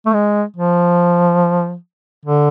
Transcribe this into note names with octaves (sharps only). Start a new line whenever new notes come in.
A3
G#3
F3
D3